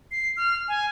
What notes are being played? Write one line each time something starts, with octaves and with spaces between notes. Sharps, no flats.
C7
F6
G#5